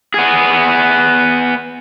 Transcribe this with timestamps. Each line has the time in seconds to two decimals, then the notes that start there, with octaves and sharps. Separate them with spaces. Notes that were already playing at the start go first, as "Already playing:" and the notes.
0.14 B3 G#4